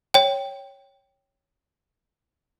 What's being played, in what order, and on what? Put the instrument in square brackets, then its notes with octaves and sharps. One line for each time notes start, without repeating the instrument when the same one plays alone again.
[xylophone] C#5 G5